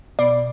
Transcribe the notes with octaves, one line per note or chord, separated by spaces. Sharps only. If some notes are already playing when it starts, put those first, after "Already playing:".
B2 D5